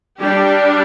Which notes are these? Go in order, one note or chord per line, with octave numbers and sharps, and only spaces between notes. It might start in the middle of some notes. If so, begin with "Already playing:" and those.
G3 D4 G4